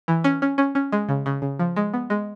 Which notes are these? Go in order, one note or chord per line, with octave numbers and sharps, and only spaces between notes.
E3
C#4
C#4
C#4
C#4
G#3
C#3
C#3
C#3
F3
G#3
B3
G#3